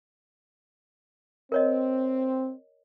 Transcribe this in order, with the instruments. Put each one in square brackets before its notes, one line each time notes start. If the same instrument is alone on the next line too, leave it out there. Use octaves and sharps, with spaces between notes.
[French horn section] C4 [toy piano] A#4 C#5 D#5